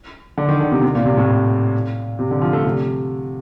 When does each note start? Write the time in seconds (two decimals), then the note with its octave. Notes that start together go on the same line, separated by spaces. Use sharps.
0.38 D3
0.49 D#3
0.60 D3
0.72 C3
0.82 C3
0.95 A#2
1.05 C3
1.17 A2
2.19 C3
2.31 D3
2.42 F3
2.53 A3
2.65 C3